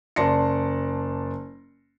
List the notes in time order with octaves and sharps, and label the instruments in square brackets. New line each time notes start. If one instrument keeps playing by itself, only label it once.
[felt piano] F#1 D5 A5 C6 A#6 C#7